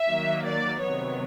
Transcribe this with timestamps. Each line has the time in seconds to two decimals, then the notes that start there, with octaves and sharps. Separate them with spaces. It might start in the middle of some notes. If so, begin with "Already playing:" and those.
Already playing: E5
0.09 D#3 F#3 A#3
0.45 D5
0.80 C3 D#3 F#3 B3 C#5